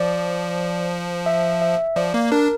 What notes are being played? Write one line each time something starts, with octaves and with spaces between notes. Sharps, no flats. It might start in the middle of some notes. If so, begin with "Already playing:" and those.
Already playing: F3 D5
E5
E5
F3 D5
A#3
D4 A#4